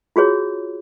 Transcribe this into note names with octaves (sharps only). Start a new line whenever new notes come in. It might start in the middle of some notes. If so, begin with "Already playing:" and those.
F4 F#4 G#4 C#5